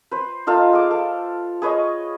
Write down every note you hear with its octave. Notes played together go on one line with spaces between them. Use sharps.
B4 C5
D#4 F4 A4 F5
G#4 D6
A4
G#4 B4 C#5 D#5